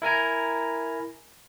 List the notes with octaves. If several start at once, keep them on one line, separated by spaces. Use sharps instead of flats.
E4 A#4 G#5 A#5